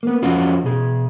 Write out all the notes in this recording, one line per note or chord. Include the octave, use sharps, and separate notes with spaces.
A#3 B3
F2 C#4 F4 F#4
B2 G#4